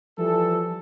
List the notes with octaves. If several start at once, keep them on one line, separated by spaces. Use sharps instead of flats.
E3 F3 G3 A4